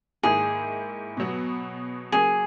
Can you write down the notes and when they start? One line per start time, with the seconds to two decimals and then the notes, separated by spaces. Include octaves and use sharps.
0.23 G#2 D#3 A#3 E4 G#4
1.17 B2 F#3 B3
2.12 C#3 F#3 A#3 G#4